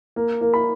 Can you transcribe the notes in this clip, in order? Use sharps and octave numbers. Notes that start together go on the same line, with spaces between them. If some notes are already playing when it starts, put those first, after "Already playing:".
A#3
A#3
B5